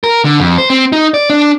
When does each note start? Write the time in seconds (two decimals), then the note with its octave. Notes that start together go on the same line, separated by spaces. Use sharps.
0.04 A#4
0.25 D3
0.40 F2
0.58 C5
0.70 C4
0.92 D#4
1.14 D5
1.30 D4